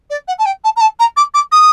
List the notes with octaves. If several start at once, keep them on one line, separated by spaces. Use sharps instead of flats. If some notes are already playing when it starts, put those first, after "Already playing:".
D5
F#5
A5
G5
A5
A#5
A5
A#5
D6
D6
D#6